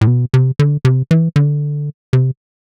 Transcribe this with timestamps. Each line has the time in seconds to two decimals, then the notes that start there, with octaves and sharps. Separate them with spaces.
0.01 A2
0.07 B2
0.34 C3
0.59 D3
0.85 C3
1.11 E3
1.36 D3
2.13 C3